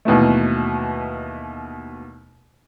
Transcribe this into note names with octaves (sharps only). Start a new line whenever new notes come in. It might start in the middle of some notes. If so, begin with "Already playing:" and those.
D#2 B2 E3 A3